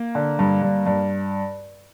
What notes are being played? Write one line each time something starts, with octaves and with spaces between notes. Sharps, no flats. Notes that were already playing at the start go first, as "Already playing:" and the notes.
Already playing: A#3
D3
G2
G2
G2